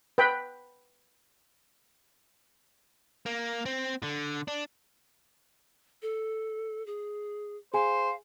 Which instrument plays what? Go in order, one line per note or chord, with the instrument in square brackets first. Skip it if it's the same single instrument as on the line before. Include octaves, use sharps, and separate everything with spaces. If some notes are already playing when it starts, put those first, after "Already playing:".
[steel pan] B4 G5 B5
[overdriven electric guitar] A#3
C4
D3
D4
[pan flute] A4
G#4
[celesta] G#4 G#5 [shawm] C5 [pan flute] F5